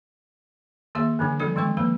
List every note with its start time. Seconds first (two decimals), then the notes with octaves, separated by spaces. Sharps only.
0.95 D#3 A#3 G#4 E5
1.19 D3 E3 F#3 D4
1.40 F3 G3 D4 A4 D5
1.56 D#3 G#3 C4 C#6
1.77 F3 A#3 B4